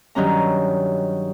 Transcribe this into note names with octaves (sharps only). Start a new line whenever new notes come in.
G2 D#3 F#3 C#4 A#5